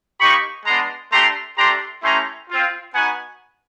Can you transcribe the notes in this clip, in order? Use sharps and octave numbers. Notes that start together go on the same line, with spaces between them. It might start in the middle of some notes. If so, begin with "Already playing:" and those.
A#3 D#4 G4 B5 C#6
G#3 B3 D4 A#5 C6
A3 D4 G4 A#5 C6
A3 D4 G4 A#5 C6
A3 C#4 E4 G4 A#5 C6
C4 F4
B3 D#4 F#4 F#5 G#5